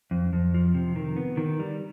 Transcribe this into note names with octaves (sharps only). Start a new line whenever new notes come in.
F2
F2
F3
C3
D#3
B3
D#3
G3